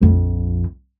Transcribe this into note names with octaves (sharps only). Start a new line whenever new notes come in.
A#1 F2